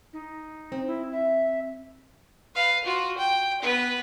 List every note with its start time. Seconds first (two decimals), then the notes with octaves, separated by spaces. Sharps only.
0.13 D#4
0.72 C4
0.87 E4
1.12 E5
2.55 B4 F5
2.85 F4 F#4
3.18 G5
3.62 B3 B4